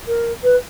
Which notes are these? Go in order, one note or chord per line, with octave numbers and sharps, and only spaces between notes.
A#4
B4